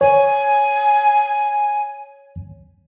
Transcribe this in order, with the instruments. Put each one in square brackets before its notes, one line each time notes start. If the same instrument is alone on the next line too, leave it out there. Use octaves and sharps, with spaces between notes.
[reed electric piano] C#5 [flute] G#5